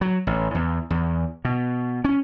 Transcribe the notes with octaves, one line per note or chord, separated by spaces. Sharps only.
F#3
A1
E2
E2
B2
C#4